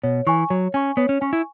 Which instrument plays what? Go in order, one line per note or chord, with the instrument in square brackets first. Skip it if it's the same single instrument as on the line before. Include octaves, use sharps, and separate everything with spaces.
[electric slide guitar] B2 [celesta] C#5
[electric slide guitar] E3 [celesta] G#5 C#6
[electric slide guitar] F#3 [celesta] C#5
[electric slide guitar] C#4 [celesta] G#5 C#6
[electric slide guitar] B3 [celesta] C#5
[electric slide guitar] C#4
[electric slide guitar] C#4 [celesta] G#5 C#6
[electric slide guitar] E4